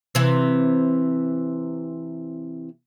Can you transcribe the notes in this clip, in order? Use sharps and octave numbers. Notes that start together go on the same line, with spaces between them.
C3 E3